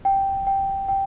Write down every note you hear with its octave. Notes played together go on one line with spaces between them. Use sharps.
G5
G5
G5